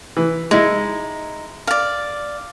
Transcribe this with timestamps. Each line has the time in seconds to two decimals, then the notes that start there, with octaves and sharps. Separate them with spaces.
0.17 E3
0.51 G#3 D#4 E4
1.67 D5 F5